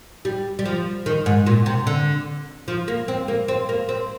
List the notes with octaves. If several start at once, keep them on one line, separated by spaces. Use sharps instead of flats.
G3
G3
F3
D#3
G#2
A#2
C3
D3
F3
A#3
C4
A#3
C4
A#3
C4